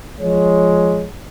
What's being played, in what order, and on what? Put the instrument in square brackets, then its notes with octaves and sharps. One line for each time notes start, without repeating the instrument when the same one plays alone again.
[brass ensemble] F3 G#3 C#5